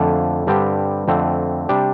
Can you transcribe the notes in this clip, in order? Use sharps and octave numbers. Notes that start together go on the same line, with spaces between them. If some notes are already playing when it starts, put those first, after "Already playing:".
Already playing: F2 D3 A3 F4
G2 D3 G3 C4 G4
F2 D3 A3 C4
C3 G3 D4 G4